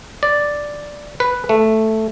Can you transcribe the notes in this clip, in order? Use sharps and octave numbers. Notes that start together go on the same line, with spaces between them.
D5
B4
A3